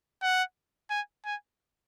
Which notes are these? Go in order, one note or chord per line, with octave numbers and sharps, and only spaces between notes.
F#5
G#5
G#5